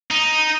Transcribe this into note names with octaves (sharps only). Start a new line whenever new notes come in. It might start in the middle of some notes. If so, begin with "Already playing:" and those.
D#4